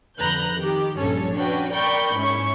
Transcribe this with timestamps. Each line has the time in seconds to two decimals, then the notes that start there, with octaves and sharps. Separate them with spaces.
0.19 F2 D3 B4 A#5 F#6 G6
0.55 D#3 G4
0.97 A#1 G2 C#4 A4 C#5
1.34 C#4 D4 F#4 B4 G5
1.72 A#4 D5 G5 B5 C#6 G6
2.17 G#2 C#4 E4 C#6